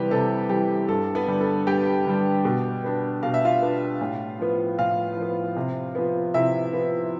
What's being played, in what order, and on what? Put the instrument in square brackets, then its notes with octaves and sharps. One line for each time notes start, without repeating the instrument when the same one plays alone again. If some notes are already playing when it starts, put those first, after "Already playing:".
Already playing: [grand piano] C3 E3 G3 B3 G4 B4
C3 A4
E3 G3 G4
G2 A4
B3 B4
D3 G3
A4
G2 G4 G5
D3 G3
B2
B3 D4
B2 F5
E5
F4 F5
B3 D4
A2
F3 B3
A2 F4 F5
F3 B3
C3
F3 B3
C3 E4 E5
F3 B3